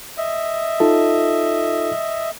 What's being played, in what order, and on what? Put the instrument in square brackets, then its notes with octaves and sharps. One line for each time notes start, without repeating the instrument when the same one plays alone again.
[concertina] D#5 E5
[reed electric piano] D#4 F4 A4